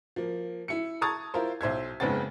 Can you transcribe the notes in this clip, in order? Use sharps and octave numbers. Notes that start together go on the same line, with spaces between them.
F3 A#3
E4 C#7
A5 A#5 C#6 D#6 G#6 A6
E4 F4 A#4 C5
B1 C5 E5 G#6
F#1 G#2 C#3 B3 C4 A6